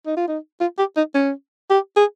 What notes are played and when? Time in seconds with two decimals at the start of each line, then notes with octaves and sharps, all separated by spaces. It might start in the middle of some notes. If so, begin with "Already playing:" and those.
0.06 D#4
0.16 F4
0.28 D#4
0.61 F4
0.78 G4
0.97 D#4
1.14 C#4
1.70 G4
1.96 G#4